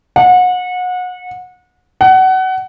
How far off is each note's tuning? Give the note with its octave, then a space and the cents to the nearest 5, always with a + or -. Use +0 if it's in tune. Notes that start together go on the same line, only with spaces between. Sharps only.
F#5 -30
F#5 +25